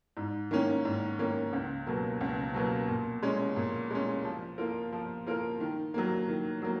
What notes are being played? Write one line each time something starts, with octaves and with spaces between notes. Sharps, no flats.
G#2
D#3 A#3 C#4
G#2
D#3 A#3 C#4
C#2
B2 F#3 A#3
C#2
B2 F#3 A#3
A#2
G#3 C#4
A#2
G#3 C#4
F3
A#3 F4 A#4
F3
A#3 F4 A#4
D#3
F#3 A#3
D#3
F#3 A#3